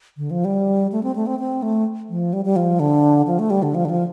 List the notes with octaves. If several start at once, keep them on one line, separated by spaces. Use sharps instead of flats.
D3
F3
G3
A3
C4
A3
C4
C4
A3
F3
G3
G3
F3
D3
F3
A3
G3
D3
F3
D3
F3